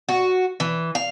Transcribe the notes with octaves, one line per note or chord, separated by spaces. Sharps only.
F#4
E3
F5